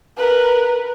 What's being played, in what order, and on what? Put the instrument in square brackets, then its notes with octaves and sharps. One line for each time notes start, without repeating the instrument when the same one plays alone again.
[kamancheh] A#4 B4